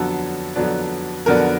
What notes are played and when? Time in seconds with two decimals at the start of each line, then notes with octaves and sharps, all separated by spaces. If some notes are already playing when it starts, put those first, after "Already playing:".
Already playing: F2 D3 F#3 B3 D4 A4
0.56 F2 D3 F#3 B3 D4
1.26 F2 D3 F#3 B3 D4 A#4